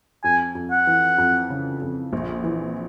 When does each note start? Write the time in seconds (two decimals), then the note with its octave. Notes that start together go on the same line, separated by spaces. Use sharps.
0.24 F2 G#5
0.55 F2
0.71 F#5
0.87 E3
1.18 F2
1.50 C#3
1.82 F2
2.13 A#1
2.44 E3